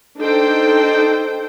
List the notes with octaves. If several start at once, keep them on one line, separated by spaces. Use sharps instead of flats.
D4 D#4 A4 C5 G5